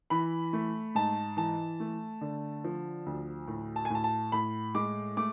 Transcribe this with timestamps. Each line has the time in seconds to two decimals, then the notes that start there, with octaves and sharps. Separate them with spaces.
0.10 E3 B5
0.53 A3
0.95 G#2 A5
1.37 E3 A5
1.80 A3
2.21 D3
2.64 F3
3.06 D2
3.48 A2
3.76 A5
3.85 G#5
3.90 A2 A5
4.04 A5
4.32 A2 B5
4.75 G#3 D6
5.17 A3 D6